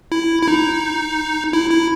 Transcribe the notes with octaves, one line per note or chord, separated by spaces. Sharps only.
E4
E4
D#4
E4
E4